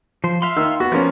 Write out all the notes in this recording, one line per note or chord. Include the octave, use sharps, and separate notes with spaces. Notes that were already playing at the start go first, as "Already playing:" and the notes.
F3 C5
E5 F5 C6
D#3 E6
B3 F#4
F3 A#3 C#4